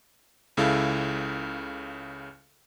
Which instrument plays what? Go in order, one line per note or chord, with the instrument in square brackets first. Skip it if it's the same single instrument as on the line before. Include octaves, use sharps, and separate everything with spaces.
[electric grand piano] C#2 C#3 E4 A4 F5